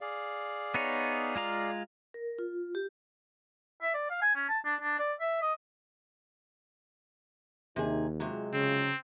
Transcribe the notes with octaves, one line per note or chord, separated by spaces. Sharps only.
G#4 D5 F5
B3 D#4 C#5
G#3 F4 A#5
A#4
F4
G4
E5
D5
F5
G#5
C#4
A5
D4
D4
D5
E5
D#5
D#2 C3 D#4 G#4
C3 F#3 G#3 F4
C#3 C4